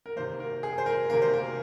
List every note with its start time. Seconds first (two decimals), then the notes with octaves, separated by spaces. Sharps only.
0.06 A#4
0.16 C3 D#3 A#3 C5
0.40 A#4
0.63 G#4
0.78 C5
0.86 A#4
1.10 C3 D#3 A#3 A#4
1.22 C5
1.34 A#4